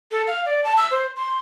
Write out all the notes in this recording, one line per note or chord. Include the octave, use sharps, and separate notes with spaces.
A4
F5
D5
A5
E6
C5
C6